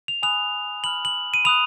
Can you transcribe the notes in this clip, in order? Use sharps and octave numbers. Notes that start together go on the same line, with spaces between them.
F7
G#5 B5 D#6 F#6 F7
B5 F6 F#7
F#7
D#7
B5 D#6 F#6 F7